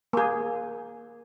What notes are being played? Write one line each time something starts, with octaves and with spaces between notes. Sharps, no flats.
A#3 G#4